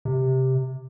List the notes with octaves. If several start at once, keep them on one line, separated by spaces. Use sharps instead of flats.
C3